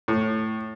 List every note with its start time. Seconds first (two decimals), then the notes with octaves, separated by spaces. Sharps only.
0.08 A2